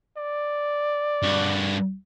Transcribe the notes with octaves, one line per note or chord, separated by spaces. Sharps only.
D5
G2 F#4